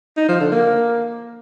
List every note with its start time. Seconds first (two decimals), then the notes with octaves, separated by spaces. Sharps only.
0.17 D#4
0.29 F3
0.40 D3
0.52 A#3